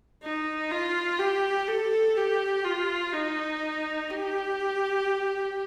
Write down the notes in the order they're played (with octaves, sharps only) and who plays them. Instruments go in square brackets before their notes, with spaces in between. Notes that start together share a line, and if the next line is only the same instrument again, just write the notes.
[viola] D#4
F4
G4
A4
G4
F4
D#4
G4